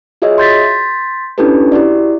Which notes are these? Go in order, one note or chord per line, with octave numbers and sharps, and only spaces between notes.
F4 F#4 G#4 C#5 D#5 E5
C6 G6 A6 B6
C#4 D4 E4 G4 A4 B4
E4 F#4 G4 D5